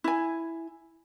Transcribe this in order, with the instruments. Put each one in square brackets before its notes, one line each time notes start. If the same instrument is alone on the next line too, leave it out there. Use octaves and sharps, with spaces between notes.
[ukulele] E4 G#5